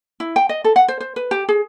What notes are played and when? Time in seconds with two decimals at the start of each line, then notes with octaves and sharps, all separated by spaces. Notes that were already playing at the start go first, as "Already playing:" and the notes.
0.20 E4
0.36 G5
0.49 D#5
0.64 A4
0.76 F#5
0.88 C5
1.00 C5
1.16 B4
1.31 G4
1.49 G#4